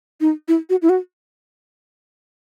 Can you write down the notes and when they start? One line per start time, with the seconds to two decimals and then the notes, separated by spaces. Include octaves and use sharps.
0.21 D#4
0.48 E4
0.70 F#4
0.82 E4
0.89 F#4